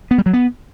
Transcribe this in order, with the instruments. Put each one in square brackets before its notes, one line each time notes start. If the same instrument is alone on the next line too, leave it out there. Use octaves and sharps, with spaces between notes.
[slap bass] B3
G3
F#3
B3